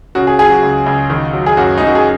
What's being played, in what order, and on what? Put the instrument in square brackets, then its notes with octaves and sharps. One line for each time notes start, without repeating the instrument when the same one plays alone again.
[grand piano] C#3 F#4
G#4
F#3 G#4
F#4
C#2
C#2
D#3
F#3
G#4
F#2 F#4
F#2 D#4
F#4
G#4